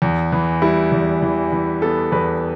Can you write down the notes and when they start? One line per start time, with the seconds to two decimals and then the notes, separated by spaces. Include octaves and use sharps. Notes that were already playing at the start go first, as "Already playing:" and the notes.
0.02 E2
0.32 E3
0.62 G3 E4
0.92 E2
1.22 E3
1.52 E3
1.82 B3 A4
2.12 E2 B4